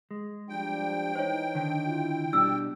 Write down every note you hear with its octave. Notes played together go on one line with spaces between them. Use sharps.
G#3
F3 G3 D4 G5
E3 D#4 C5 C#5
D3 D#3
E4 F4
B2 G3 D4 E6